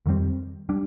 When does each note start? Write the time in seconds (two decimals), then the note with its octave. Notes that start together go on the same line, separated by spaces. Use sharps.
0.06 F2 D#3 G3 C4
0.69 G3 D4